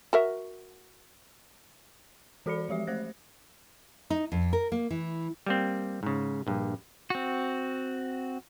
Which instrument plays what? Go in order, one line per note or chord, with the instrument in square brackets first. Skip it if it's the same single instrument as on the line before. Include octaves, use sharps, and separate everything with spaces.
[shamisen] F#4 A#4 E5
[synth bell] E3 F#4 A4 D5 B5 C#7
F3 G#3 G4 E5
A3 C5 F#6 A#6
[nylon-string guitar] D#4
F2
A#4
A#3
E3
[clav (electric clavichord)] G3 A#3 C4
G#2 C#3
A#1 G2
[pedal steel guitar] C4 F#4